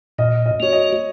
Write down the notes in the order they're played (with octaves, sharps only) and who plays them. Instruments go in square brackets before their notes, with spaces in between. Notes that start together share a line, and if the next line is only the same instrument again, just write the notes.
[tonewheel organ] A#2 [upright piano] D#5
[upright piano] D#5
[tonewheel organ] A#3 F#4 [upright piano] C#5
[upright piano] D#5